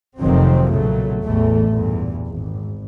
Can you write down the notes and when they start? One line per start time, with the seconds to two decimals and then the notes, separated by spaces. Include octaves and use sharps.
0.19 F1 C3 D#3 F3 F#3 C4
0.72 B1 A#2 C#3 F#3 A3
1.24 A1 E2 B2 E3 A3
1.68 E2 G2 A#2
2.26 G#1